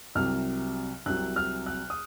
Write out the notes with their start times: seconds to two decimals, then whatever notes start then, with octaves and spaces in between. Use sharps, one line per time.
0.15 C2 C3 F#3 F6
1.06 C2 C3 F#3 F#6
1.36 F6
1.66 F#6
1.90 D#6